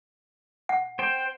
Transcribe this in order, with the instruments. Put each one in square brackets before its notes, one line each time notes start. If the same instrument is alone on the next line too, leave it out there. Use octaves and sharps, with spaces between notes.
[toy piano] F#5
[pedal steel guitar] C5 G5